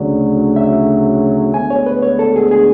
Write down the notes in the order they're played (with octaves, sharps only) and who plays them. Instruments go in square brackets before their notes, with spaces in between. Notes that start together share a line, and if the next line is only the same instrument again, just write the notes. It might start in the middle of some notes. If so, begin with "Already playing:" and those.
Already playing: [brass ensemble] D2 C#3 F#3 [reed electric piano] D5
[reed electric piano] E5
[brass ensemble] D2 D3 G#3 B3 [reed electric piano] G#5
[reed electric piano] C#5
B4
C#5
A4
G#4
G#4